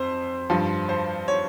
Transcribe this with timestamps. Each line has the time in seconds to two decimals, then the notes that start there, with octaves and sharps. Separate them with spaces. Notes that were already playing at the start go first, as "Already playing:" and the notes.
Already playing: F2 C5
0.50 G2 F3
0.89 C5
1.28 C#5